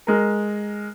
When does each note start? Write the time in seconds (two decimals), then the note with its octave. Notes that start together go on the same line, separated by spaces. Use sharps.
0.07 G#3 A#4